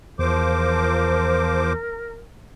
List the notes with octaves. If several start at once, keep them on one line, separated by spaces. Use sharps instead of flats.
E2 F3 A#4 C5 D6